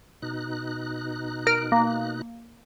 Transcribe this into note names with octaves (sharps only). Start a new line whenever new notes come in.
B2 D#4 F#6
A#4 F6 D7
A#3